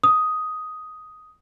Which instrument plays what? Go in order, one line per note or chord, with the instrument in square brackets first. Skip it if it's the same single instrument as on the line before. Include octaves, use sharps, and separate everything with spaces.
[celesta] D#6